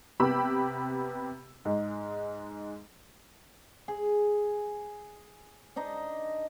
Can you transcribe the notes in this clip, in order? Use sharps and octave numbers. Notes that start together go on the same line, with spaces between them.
C3 B3 G4 B5 D6 E6
G#2 G#3
G#4
D4 D#4 D#5